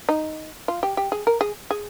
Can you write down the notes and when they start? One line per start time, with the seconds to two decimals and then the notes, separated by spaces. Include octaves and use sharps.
0.09 D#4
0.68 F4
0.83 G4
0.97 G4
1.12 G#4
1.27 A#4
1.41 G#4
1.71 G#4